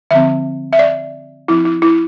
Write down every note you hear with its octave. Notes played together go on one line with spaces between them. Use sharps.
D3 F3 C4 E5
E5
D5
F3 C4 E4
E4
E4